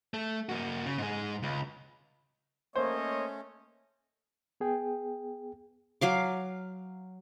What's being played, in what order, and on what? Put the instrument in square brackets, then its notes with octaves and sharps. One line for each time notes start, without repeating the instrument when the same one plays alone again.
[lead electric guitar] A3
A#3 F#4
C#3
G#2 G#3
C#2
[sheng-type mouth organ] A3 C#4 [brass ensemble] A#3 C#5 D#5 [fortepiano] C5
[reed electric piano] B3 G#4 G5
[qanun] F#3 F5 D6